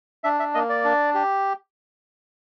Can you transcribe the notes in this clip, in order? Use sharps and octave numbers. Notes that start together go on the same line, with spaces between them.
D4 E5
E5
A#3 D#5
D5
D4
G4